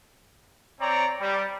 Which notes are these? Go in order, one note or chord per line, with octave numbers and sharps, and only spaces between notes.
C4 C#5 D5 G5 A#5
G3